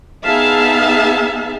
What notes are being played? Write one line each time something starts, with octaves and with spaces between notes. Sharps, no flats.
B3 D#4 G#4 E5 F5 A5